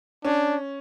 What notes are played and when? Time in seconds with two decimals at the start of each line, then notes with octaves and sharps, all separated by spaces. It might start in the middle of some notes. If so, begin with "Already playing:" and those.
0.25 C#4 D4